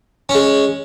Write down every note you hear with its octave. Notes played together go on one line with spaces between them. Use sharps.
C#4
G#3